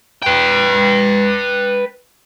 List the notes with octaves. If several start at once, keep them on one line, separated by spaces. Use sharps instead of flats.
B4 G5